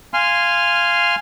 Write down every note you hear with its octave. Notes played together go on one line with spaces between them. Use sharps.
F5 G#5 C6 F6